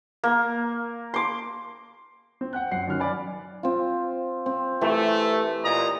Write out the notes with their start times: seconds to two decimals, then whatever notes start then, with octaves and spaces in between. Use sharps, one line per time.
0.24 A#3
1.14 C6 D6
2.41 C4
2.53 F#5 G5 F#6
2.71 F#2 F#5 C7
2.87 F#2 D#3 C#4 F#4 F6 F#6
3.00 D5 G#5 B5
3.63 C4 F4
4.46 C4
4.81 E3 A3 G4 A#4
5.64 A#2 D#5 A#5